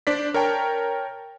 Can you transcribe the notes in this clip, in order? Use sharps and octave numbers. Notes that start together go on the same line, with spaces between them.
D4 C5 D5 B6
A#4 C#5 G5 A5